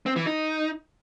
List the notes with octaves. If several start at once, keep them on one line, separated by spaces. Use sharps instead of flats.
C4
E3
D#4